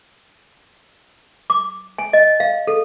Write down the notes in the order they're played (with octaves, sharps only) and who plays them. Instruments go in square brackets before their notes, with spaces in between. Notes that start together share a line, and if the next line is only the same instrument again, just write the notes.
[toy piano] D6
G#5
D#5
F5
A4